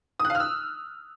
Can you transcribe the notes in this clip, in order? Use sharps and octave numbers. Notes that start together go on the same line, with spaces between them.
D#6
F#6
F5
F6
E6